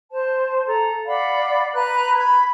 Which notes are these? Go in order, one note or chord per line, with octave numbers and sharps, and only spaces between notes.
C5 A5
A4 A#5
D5 F5 F#5 B5
B4 A#5 F#6
B5 G#6